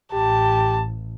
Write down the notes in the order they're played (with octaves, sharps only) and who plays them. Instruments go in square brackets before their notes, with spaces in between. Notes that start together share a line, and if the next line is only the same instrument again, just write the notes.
[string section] A1 [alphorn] G4 [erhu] A5